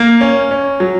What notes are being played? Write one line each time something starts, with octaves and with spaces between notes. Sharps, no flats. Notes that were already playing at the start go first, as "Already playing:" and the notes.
Already playing: A#3
C#4
C#4
F#3